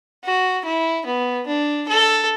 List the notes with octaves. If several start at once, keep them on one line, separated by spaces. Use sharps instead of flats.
F#4
E4
B3
D4
A4